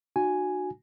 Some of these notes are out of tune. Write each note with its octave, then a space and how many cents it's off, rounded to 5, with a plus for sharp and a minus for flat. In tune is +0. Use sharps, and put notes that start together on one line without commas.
D#4 -40 F#4 -10 G#5 +0